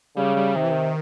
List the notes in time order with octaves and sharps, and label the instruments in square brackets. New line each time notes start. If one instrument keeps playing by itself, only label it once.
[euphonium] C#3 [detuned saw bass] G3
[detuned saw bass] G3
[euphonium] C3 [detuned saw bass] D#3
[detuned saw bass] E3
D#3